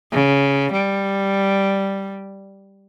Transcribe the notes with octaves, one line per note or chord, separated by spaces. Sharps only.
C#3
G3